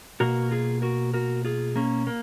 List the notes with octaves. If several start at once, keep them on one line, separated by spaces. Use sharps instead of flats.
B2 A#3 F#4 A#4
F4 G#4
F#4 A#4
F#4 A#4
F4 G#4
A#3 C#4
A#3